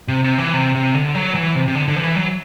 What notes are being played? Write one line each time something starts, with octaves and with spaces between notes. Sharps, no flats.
C3
C3
E3
C3
C3
D3
F#3
E3
C3
C3
D3
D3
E3
F#3